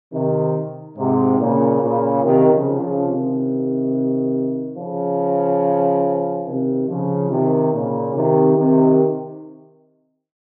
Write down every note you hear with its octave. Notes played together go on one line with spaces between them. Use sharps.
C3 D#3
G#2 C3
A#2 C#3
A#2 C#3
C3 D#3
C#3 F3
C#3 F3
C3 D#3
C#3 F3
C3 D#3
C#3 F3
C3 D#3
A#2 C#3
C3 D#3
C3 D#3